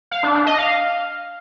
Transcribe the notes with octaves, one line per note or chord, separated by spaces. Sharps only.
F5
D4
D4
D#5
F5